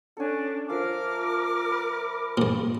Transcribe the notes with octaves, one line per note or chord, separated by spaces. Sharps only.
C#4 D4 A4 G#5
F3 A#4 E5 F5 D6 F6
B5
G2 A#2